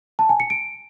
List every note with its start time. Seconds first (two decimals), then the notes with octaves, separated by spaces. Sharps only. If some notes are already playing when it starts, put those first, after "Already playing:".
0.19 A5
0.29 G#5
0.40 C#7
0.50 D7